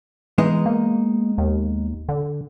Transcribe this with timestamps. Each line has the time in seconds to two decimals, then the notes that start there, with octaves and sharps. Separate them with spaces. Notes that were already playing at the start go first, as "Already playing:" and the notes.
0.38 E3 G#3 B3 D#4
0.66 A#3
1.38 D#2
2.09 D3